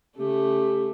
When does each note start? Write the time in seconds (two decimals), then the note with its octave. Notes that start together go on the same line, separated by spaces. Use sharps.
0.18 C#3 A3 G4